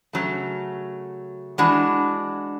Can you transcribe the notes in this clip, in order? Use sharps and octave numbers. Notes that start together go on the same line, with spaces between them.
C#3 F#3 A3
E3 G#3 D4 F#4